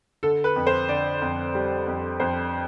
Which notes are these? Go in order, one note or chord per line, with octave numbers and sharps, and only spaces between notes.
D3 A4
B4
F2
C5
D3 D5
F2
G3
F2
F2 C5